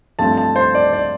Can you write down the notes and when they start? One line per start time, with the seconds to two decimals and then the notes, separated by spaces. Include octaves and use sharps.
0.19 G2 F3 A3 C4 A5
0.37 A5
0.56 C5
0.75 D5
0.93 D5